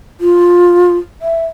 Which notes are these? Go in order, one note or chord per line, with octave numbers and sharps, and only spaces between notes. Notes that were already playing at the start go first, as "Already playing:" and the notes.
F4
E5